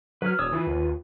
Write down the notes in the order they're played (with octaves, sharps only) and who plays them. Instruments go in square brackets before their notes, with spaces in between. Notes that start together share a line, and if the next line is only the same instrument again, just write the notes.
[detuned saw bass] F#3 [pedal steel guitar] B4 F6
[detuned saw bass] E1 [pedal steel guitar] C#5 D#6 E6
[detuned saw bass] E3 [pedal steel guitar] F4 B4
[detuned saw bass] D#2